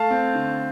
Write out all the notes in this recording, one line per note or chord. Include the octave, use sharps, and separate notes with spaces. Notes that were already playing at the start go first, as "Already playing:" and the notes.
Already playing: A3 F5 A5
C4
D3